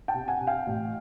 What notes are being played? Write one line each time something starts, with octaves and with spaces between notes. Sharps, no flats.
G5 A5
C3
F#5 G#5
C3
F5 G5
A1